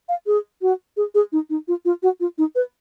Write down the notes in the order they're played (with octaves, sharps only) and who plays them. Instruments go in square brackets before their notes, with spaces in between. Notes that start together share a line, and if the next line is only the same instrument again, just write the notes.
[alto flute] F5
G#4
F#4
G#4
G#4
D#4
D#4
F4
F4
F#4
F4
D#4
B4